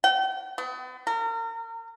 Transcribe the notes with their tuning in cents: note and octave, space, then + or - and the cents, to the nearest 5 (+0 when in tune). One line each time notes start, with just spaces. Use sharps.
G5 -40
B3 +40
A#4 -35